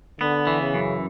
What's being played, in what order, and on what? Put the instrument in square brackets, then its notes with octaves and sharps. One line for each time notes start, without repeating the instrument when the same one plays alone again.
[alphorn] D3 [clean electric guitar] B3
[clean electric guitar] E3
[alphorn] C#3
[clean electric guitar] F#2